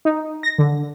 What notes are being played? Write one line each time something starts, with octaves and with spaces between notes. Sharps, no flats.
D#4
A#6
D3